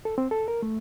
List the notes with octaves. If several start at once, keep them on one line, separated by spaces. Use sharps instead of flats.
A4
C4
A4
A#4
A3